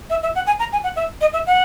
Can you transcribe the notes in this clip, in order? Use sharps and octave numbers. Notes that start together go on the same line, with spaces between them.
E5
E5
F#5
G#5
A#5
G#5
F#5
E5
D#5
E5
F#5